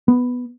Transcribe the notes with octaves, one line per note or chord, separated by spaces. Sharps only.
B3